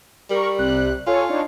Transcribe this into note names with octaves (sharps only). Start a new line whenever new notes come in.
G3 A#4 C#6
C2 C3 F#6
F4 A4 C#5 G#5
D4 D#4 C#5